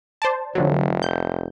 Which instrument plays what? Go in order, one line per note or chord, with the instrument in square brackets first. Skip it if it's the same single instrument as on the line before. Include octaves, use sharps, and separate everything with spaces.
[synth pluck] C5 D5 A5
[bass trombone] F1 [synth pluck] D3 F3 F#3
[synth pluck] G6